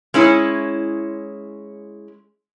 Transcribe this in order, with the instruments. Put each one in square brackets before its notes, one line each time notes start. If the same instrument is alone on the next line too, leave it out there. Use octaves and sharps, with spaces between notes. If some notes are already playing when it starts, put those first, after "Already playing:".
[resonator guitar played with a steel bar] G#3 C#4 E4